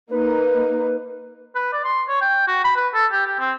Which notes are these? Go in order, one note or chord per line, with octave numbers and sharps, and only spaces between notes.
A#3 D#4 B4
B4
D5
C6
C#5
G5
F#4
B5
B4
A4
G4
G4
C4